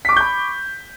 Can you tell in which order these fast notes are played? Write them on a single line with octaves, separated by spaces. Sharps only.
B6 D6 C#6 G6 B5